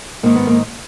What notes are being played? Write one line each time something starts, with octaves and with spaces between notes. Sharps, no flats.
G#2 D#3 A#3
B3
A#3